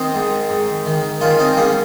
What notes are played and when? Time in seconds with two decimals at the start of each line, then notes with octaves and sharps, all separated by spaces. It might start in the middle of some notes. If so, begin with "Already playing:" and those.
Already playing: D#3 C4 D#4
0.15 G#2
0.49 G#2
0.86 D#3
1.21 D#3 C#4 F4
1.39 C4 D#4
1.57 G#2 A#3 C#4